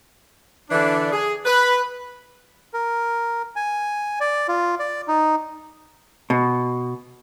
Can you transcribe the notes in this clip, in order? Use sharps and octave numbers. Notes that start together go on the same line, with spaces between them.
D3 E3 D4
G#4
B4
A#4
G#5
D5
F4
D5
D#4
B2